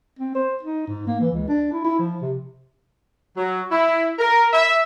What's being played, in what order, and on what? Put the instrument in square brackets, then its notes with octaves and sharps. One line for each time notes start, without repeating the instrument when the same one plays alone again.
[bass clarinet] C4
C5
D#4
G#2
A#3
E3
C#2
D4
E4
E4
F3
C3
[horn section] F#3
E4
A#4
E5